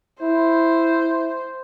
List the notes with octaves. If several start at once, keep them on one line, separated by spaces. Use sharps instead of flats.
E4 C5